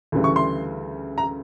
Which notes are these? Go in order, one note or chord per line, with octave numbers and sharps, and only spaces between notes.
D2 C#3 E3 G3
C#6
C6
A#5